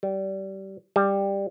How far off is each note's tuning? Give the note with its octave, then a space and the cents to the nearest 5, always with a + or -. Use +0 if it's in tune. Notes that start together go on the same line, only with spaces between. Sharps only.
G3 -25
G3 +10